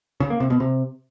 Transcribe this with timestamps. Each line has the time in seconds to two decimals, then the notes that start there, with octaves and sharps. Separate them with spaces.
0.20 C#3
0.30 A#3
0.40 C3
0.50 B2
0.60 C3